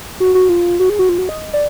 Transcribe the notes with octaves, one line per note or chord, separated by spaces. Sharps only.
F#4
F#4
F4
F#4
G#4
F#4
F4
F#4
D#5
D5